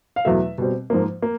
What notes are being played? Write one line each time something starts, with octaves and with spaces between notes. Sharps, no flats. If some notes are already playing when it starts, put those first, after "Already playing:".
F5
E2 B2 F#3 A3 E5
B2 G3 C4
G#2 F3 A#3
A#3